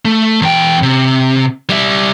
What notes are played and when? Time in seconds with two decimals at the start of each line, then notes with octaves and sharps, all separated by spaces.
0.05 A3
0.42 E2 G5
0.83 C3
1.70 G3 E5